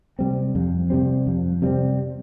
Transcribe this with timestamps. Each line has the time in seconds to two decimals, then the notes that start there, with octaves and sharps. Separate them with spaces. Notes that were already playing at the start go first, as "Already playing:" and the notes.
0.19 C3 G3 C4
0.55 F2
0.90 C3 G3 C4
1.27 F2
1.62 C3 G3 C4